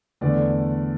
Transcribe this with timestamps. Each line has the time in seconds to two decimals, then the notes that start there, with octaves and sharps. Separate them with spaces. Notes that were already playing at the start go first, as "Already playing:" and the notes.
0.21 E2 D3 A3 D5